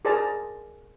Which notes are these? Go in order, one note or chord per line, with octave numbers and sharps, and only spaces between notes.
G#4 A#4 C5 D5 A5 A#5